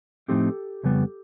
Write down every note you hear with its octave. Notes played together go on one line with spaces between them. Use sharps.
A2 F3 A3 C4 D#4 G4 A4
F2 C#3 G3 B3